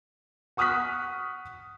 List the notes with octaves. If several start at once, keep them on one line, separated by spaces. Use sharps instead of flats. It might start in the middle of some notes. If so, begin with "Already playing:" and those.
F#5 C#6 D#6 F6 F#6 B6